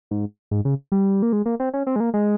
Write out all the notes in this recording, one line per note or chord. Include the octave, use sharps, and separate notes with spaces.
G#2
G#2
C#3
G3
A#3
G#3
A#3
C4
C#4
C4
G#3
A#3
G#3